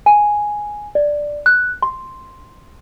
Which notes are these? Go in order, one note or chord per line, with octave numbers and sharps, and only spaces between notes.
G#5
D5
F#6
C6